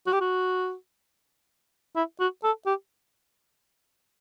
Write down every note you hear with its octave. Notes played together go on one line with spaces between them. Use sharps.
F#4
G4
F#4
E4
F#4
A4
G4